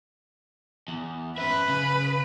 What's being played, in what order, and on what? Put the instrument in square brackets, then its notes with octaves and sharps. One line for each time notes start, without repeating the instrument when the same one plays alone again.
[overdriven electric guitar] E2
[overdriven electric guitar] C#4 E5 [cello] B4
[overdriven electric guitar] C#3